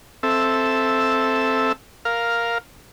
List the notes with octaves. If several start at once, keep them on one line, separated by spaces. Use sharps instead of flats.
C4 A4 E5
A#4 F5